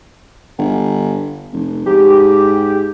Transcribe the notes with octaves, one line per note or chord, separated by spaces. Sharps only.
G1
F1
G#2 G4